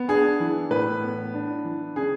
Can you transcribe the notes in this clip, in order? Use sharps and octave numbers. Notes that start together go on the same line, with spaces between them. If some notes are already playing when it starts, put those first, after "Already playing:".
Already playing: B3
D4 G#4
E3
A2 B4
B3
D4
E3
C#3 G#4